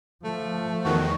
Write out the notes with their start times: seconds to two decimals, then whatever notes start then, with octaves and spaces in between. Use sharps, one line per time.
0.24 F3 A3
0.85 E2 D#3 F#4